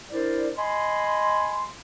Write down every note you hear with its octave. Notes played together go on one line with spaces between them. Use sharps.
D4 E4 A#4 C5 D5
D#5 G#5 B5 C6